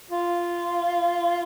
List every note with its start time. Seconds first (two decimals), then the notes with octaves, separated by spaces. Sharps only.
0.11 F4